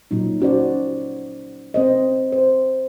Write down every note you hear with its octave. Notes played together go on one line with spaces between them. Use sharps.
A#2 F#3 D#4
C#4 F#4 C5 D5
C4 C5 D#5
C5